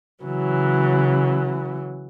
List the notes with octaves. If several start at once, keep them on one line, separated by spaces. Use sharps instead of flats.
C#3 E3 F#3